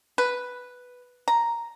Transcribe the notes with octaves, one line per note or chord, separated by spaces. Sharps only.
B4
A#5